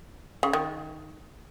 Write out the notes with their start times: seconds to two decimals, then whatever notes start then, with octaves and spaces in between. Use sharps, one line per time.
0.43 C#3
0.53 D#3